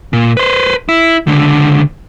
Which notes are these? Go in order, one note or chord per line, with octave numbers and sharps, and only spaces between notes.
A#2
B4 C5
E4
C#2 D3